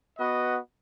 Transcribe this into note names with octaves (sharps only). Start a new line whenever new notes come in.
B3 F#4 B4 D#5 F#5